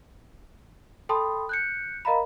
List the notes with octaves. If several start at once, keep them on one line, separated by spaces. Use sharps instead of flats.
A4 G5 A5 B5 C6 D#6
F#6 G6 C#7
A#4 D#5 F5 A#5 B5